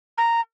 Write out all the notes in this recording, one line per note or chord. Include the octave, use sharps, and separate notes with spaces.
A#5